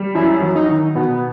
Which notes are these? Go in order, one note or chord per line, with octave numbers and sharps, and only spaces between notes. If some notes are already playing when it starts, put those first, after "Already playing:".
Already playing: G3
F#2 E4
F#3
D#4
D#3
B2 B3